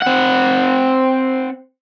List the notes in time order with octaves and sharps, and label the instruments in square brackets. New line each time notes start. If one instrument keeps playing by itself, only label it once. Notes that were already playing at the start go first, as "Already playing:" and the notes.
[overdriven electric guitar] C4 F#5